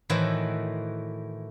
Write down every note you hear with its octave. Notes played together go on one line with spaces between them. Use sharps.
A2 D#3 E3 F#4 C5